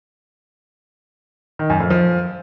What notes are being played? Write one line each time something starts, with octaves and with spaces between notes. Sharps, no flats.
D#3
F#2
F2
F3